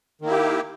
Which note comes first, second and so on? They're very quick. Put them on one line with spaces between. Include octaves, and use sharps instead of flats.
D#3 A#3 E4 G4